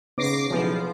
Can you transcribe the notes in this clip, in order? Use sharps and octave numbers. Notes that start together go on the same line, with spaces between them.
C#3 B3 D#4 C#5 D6 A#6 C7
B1 F3 B3 E4 G#4